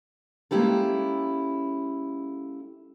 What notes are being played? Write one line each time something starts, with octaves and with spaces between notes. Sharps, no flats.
G#3 A#3 C#4 E4 G4 A4